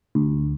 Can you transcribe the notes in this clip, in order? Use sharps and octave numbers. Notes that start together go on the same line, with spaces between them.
D2